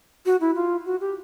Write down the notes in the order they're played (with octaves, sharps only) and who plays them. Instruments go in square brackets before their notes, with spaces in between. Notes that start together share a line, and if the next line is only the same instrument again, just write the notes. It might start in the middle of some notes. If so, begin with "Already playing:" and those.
[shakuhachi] F#4
E4
F4
F#4
G4